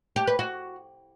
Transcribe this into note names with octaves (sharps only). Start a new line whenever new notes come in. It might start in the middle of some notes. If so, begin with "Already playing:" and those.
G4
B4
F#4